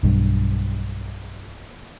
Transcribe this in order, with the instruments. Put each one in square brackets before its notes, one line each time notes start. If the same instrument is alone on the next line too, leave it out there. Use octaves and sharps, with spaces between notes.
[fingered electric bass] B1 G2